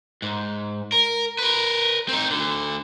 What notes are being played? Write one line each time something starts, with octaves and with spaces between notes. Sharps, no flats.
G#2
A#4
A#4 B4
C4 D#4
D2 D3